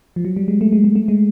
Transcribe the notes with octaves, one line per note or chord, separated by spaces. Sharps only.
F3
F#3
G3
G#3
A3
G#3
A3
A3
G#3